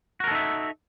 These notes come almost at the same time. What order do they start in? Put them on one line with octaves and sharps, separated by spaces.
F#4 A#4 A4 D#4 E5